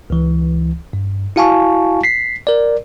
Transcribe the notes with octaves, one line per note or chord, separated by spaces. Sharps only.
C#2 E3
G2
E4 F#4 F5 G#5 A5 C#6
B6 C7
A#4 D5